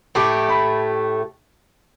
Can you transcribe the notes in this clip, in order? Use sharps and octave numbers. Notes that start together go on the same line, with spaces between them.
A2 A3 G4 D6
B5